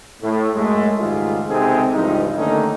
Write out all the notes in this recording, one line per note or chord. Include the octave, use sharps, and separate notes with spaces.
A2
F#2 G#3 A3
C#2 G#2 D#3 G3 F4 G#4
C#2 C3 C4 D#4 G#4 A4
C#2 G2 E3 F3 D#4
D3 D#3 A3 A#3 C#4 D#4